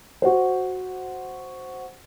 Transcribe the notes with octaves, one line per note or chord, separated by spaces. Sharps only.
F#4 C5